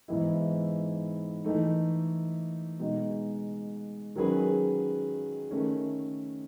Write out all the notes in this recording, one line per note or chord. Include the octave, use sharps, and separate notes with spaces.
G#2 E3 B3 E4
E3 A3 D#4
B2 G#3 D#4
D#3 F#3 C#4 G#4 B4
D#3 A3 C#4